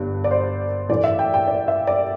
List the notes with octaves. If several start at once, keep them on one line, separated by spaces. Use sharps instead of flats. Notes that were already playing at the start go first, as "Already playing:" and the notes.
Already playing: G1 G2 G3 D4
D5
C5
A2 E3 A3 D5
E5
G5
G5
D5
E5
D5